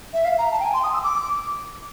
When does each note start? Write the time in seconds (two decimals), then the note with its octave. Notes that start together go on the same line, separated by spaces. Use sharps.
0.13 E5
0.24 F5
0.38 A#5
0.51 A5
0.60 G5
0.64 G#5
0.73 C6
0.83 D#6
0.93 E6
1.03 D6